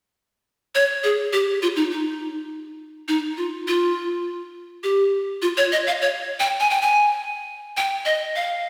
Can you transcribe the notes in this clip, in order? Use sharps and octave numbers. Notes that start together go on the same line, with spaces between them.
C#5
G#4
G4
F4
D#4
D#4
D#4
F4
F4
G4
F4
C#5
D#5
F5
C#5
G5
G#5
G5
G#5
G5
D#5
F5